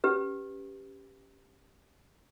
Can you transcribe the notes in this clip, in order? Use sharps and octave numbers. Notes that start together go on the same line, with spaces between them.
C#4 G4 B4